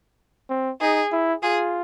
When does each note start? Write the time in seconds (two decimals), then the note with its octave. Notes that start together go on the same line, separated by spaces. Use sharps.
0.50 C4
0.81 D#4 G#4
1.12 E4
1.43 F4 G#4